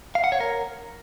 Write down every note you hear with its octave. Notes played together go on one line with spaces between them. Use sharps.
F5
F#5
C#5
A#4